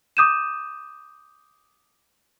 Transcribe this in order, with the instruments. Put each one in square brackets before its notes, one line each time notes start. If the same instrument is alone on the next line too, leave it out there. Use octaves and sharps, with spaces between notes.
[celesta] D6 D#6 G6 D#7 E7